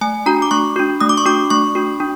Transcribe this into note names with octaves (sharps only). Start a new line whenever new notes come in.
A3 G#5
D4 F#4 A#5
D6
A3 C#6
D4 F#4
A3 D#6
D6
C#6
D4 F#4 D6
A3 C#6
D4 F#4
D4